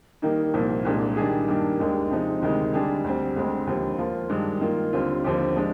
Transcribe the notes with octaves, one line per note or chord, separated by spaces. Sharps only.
D#3 G3 A#3 D#4
C2 A#2 F3 A#3
C2 A#2 G#3 D4
D#3 G3 D4 G#4
G2 D#3 A#3 D4 G4
D#2 D#3 G#3 D4
C3 F3 G#3 D#4
D2 C3 D#3 G#3 D#4
D3 G3 D4 G#4
D2 D3 G3 C4
D2 D3 G#3 C4
D#2 D3 F3
F3 A#3 F4
G2 D#3 G#3 D4
D#3 A#3 F4
D#2 D3 G3 C4 F4
D#2 D3 F3 C4 G4
F3 G#3 D4